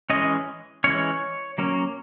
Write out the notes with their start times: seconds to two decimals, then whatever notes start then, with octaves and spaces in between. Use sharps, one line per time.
0.10 E3 G#3 C#4 D#5
0.84 E3 G#3 C#4 C#5
1.58 F#3 A#3 C#4